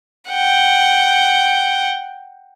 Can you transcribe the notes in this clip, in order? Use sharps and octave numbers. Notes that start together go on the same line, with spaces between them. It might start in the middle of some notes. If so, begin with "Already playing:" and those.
F#5 G5